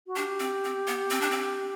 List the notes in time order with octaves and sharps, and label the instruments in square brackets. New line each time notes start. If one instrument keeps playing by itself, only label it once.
[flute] F#4
[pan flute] D4 [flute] G4
[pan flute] C4
C4
B3
C4
D4
C4